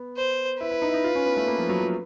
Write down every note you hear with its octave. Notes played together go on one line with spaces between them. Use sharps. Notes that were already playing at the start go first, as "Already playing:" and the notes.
Already playing: B3
C5
E4 B4
E4
D#4
E4
D#4
F4
C#4
B3
A3
A#3
F3
F#3
F3